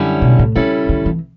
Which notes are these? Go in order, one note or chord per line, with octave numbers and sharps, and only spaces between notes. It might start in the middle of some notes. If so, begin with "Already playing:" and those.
Already playing: F#2 D3 G3 C#4 E4
B2
A2
C#3 G3 C#4 E4 A4
D3
E3